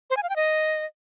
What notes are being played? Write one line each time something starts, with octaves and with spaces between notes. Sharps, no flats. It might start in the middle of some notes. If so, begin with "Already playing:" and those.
C5
G#5
F5
G5
D#5